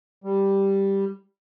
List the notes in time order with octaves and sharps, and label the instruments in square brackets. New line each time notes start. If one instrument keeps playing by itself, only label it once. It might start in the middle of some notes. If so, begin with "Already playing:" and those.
[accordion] G3